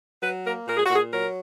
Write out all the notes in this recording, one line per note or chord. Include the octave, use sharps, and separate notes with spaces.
F#3 B4
A#3 A#4
A#2 A#4
G#4
F#4
A#2 G#4
F#3 A#4